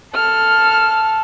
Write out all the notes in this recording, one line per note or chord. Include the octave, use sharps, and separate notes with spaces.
A4 F6